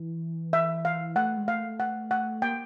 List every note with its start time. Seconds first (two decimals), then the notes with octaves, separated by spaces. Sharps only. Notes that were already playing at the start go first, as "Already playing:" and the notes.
Already playing: E3
0.53 E5
0.85 F5
1.16 A3 F#5
1.37 G#3
1.47 A3 F5
1.80 F#5
2.11 F#5
2.42 A#3 G5